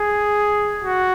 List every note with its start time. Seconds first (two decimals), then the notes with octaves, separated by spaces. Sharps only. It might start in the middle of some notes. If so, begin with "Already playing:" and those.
Already playing: G#4
0.84 F#4